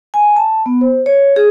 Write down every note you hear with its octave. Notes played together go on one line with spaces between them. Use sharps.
G#5
A5
B3
C5
C#5
G#4